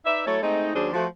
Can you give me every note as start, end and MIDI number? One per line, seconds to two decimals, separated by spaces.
0.05 0.25 63
0.05 0.25 71
0.05 0.25 74
0.05 0.25 76
0.26 0.41 54
0.26 0.41 57
0.26 0.41 64
0.26 0.41 69
0.26 0.41 73
0.42 0.71 56
0.42 0.71 57
0.42 0.71 60
0.42 0.71 63
0.74 0.88 39
0.74 0.88 54
0.74 0.88 61
0.74 0.88 62
0.74 0.88 68
0.74 0.88 72
0.93 1.06 53
0.93 1.06 57
0.93 1.06 66